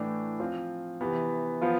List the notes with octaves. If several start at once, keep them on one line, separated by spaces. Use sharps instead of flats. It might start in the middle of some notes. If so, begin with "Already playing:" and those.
Already playing: A2 E3 A3 D4
F3 C4 F4
C3 E3 B3
F3 B3 F4